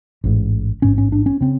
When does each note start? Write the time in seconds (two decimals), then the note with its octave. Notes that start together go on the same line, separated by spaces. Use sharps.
0.24 A1 G#2
0.82 A1 G#2 C#4
0.98 C#4
1.12 D4
1.26 C#4
1.41 C#3 C4